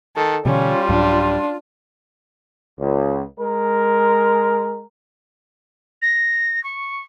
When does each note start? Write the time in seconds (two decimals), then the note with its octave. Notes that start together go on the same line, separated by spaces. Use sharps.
0.16 D#3 A4
0.46 B2 D3 E3 G3 C#4 F4
0.89 C2 G#2 F#3 D4
2.79 C#2
3.38 G#3 A#4
6.02 A#6
6.64 C#6